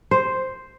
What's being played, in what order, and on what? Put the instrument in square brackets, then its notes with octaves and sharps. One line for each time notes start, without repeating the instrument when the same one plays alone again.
[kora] C5